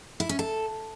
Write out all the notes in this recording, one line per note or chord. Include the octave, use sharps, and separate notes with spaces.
E4
C#4
A4